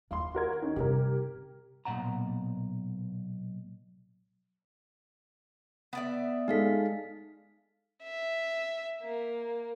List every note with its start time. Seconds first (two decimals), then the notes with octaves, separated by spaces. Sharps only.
0.11 D#2 D4 F5 C6
0.35 F#4 A#4 G#6
0.62 D#3 C#4
0.76 G2 C3 G4 A#4
1.85 B1 G2 A#2 F#5 A#5
5.93 B3 D5 E5
6.48 G#3 D#4 A4 F5 B6
8.03 E5
9.03 A#3